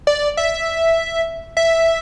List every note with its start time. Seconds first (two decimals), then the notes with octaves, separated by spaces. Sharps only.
0.07 D5
0.37 E5
1.57 E5